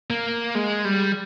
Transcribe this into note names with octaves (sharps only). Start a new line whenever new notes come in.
A#3
G#3
G3